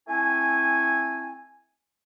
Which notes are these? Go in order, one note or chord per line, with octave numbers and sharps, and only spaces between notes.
A3 C4 E4 G#5